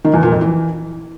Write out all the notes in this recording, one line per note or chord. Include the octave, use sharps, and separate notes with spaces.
D#3
E2
A#2
F2
E3